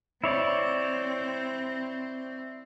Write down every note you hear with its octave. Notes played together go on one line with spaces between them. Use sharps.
C4 E4 C#5 D5